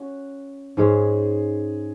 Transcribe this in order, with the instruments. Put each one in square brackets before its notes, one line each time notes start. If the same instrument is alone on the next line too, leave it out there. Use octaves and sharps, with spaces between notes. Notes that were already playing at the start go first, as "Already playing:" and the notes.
Already playing: [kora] C#4 F#4
[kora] G#2 G#3 C#4 [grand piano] G#4